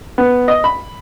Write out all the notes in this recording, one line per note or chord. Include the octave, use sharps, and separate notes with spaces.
B3
D#5
B5